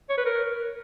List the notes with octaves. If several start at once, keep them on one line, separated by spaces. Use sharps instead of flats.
C#5
B4
A#4